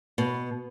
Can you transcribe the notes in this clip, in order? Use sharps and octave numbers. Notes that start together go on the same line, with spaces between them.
B2